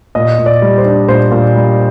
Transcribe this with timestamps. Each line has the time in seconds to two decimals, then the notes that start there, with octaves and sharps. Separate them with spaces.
0.15 A#2 D#5
0.38 A#2
0.46 D5
0.62 G3
0.78 C5
0.85 D4
1.08 A#2 C5
1.31 A#2
1.55 G3